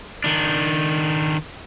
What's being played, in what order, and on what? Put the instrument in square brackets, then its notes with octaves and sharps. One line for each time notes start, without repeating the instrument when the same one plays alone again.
[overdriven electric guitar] D#3 D4